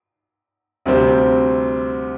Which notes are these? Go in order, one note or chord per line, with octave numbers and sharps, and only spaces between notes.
D2 C3 G3 C4